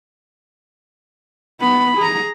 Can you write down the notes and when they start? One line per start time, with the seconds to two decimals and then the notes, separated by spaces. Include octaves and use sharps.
1.60 B3 B5
1.97 G#4 A#5